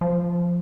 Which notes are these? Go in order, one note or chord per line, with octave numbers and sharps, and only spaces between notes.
F3